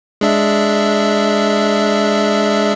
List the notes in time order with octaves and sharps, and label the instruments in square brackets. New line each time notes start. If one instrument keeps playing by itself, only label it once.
[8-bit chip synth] G#3 D4 E5